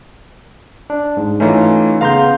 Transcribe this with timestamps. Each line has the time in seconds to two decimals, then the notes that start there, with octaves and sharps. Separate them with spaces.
0.90 D4
1.17 G#2
1.40 E3 A3 C#4 D#4 F4
2.01 C#3 B3 F5 A#5 C6 G6